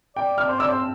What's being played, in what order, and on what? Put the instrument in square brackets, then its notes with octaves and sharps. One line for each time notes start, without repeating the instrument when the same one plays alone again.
[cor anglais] D5 [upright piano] G5
[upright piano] F6
[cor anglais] C5
[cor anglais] D5 [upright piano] E6
[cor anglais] C5